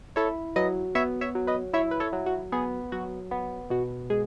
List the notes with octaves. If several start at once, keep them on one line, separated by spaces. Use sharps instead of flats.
E4 A4 C#5
F#3 B4 D#5
B3 C#5 E5
C#5 E5
F#3
B4 D#5
E4 C#5 E5
B4
A4 C#5
F#3
F#4
B3 G#4
F#3 F#4
B3
B2 F#4
G#3 G#4